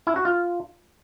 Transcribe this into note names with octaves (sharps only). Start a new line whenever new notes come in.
E4
F#4
F4